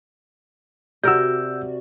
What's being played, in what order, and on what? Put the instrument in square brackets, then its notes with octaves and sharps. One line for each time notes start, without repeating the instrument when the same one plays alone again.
[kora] C3 A#4 [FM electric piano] F#4 D5 [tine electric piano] E6 G6